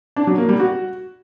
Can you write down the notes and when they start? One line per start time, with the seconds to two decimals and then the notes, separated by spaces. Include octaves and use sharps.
0.16 D4
0.27 F#3
0.38 A#3
0.49 G3
0.59 F#4